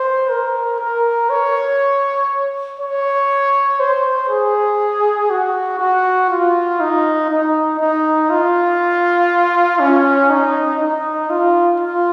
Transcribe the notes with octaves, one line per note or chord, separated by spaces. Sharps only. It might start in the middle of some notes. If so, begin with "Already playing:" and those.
Already playing: C5
A#4
A#4
C#5
C#5
C5
G#4
F#4
F#4
F4
D#4
D#4
D#4
F4
C#4
D#4
D#4
F4
F4